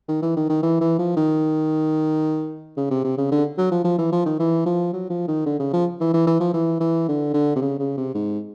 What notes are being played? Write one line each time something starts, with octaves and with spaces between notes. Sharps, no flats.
D#3
E3
D#3
D#3
E3
E3
F3
D#3
C#3
C3
C3
C#3
D3
F#3
F3
F3
E3
F3
D#3
E3
F3
F#3
F3
D#3
D3
C#3
F3
E3
E3
E3
F3
E3
E3
D3
D3
C3
C#3
C#3
C3
G#2